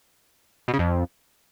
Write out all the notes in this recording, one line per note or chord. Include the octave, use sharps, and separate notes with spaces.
B2
C#3
F2